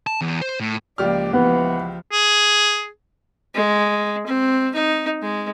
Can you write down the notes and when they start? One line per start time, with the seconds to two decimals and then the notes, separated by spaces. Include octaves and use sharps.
0.07 A5
0.21 E2
0.41 C5
0.60 A2
0.98 C#2 F3 A#3 G4 D5 F6
1.33 E3 F3 B3 F#5 B5
2.12 G#4
3.54 G#3
4.26 C4
4.74 D#4
5.22 G#3